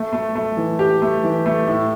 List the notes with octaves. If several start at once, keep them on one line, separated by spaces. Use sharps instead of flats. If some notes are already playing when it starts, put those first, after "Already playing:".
Already playing: A3
A3
A3
E3
G4
A3
E3
A3
A2